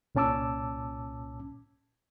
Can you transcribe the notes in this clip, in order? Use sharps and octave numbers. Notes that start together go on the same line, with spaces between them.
C2 A#2 C#4 A5 D6 E6